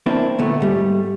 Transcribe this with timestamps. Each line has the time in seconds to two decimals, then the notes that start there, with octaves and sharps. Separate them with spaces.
0.06 A#3 C4 D4 E4
0.39 D2 A#2 A3 B3
0.60 G#2 G3 A3